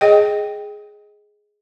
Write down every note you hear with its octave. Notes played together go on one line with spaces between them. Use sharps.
G#4 D#5 G5